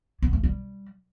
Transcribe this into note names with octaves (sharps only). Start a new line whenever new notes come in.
B3
A3
G3